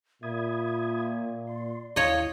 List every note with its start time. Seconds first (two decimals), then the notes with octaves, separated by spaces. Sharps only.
0.23 A#2 E5 B5 D#6 G#6
1.47 D5 C6
1.96 D#2 E4 C#5 D#5 F5